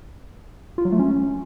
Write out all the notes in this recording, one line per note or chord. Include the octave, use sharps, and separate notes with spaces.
F4
F#3
A3
C#4